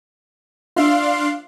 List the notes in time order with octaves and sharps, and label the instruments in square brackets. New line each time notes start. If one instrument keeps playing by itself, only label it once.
[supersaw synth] D4 F5 C6 [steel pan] F4 E5